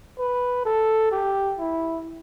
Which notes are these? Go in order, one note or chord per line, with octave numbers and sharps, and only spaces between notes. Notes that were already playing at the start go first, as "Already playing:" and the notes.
B4
A4
G4
E4